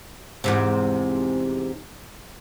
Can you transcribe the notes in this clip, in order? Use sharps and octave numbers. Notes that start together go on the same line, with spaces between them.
E2 G#2 C3